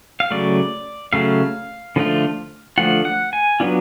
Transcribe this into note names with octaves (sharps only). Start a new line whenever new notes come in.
F5
C#3 F#3 A3 D5
C#3 F#3 A3 F5
D3 F3 A3 F4
D3 F3 A3 F4 F#5
F#5
G#5
F#3 B3 D4 F4